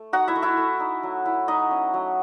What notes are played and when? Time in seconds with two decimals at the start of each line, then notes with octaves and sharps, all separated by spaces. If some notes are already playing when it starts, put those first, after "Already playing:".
Already playing: A3
0.13 D#4 F#4 F#5
0.28 E4 E5
0.36 A3
0.42 E4 E5
0.57 A3
0.80 D#4
1.03 F#3
1.26 E4
1.48 F#3 D#4 D#5
1.71 C#4
1.94 F#3